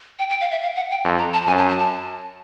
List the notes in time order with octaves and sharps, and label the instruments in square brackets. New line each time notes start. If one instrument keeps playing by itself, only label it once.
[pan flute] G5
G5
F5
E5
F5
F#5
G5
[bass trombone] F2 [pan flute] A5
[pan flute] A#5
A5
[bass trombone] F#2 [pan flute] G#5
[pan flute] A5
A5
A5